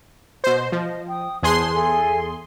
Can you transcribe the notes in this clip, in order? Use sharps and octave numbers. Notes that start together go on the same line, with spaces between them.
B2 C5 D#5
F3 D#5
G5 D#6
E2 G#4 C5 A5 C6 F#6
A4 E5 G#5